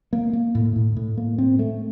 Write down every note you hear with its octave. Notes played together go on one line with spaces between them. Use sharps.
A#3
A#3
A2
A2
A2
A#3
C4
A3